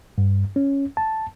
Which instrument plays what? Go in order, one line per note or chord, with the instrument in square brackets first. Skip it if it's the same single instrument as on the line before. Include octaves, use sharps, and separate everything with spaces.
[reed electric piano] G2
C#4
A5